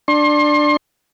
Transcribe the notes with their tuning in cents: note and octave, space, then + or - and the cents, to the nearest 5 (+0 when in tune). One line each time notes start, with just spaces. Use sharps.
D4 +10 C6 +35